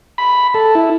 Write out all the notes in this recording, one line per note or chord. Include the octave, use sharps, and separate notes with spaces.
B5
A4
E4